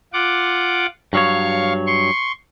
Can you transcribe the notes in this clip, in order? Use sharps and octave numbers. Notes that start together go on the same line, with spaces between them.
F4 F#5 D6
G2 F#3 C#5 F5 C#6
C6 C#6